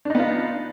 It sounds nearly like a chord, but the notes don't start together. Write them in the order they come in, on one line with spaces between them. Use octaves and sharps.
D4 D#4 B3 F4